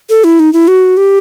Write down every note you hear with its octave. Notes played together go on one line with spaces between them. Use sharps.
A4
E4
D#4
E4
F#4
G4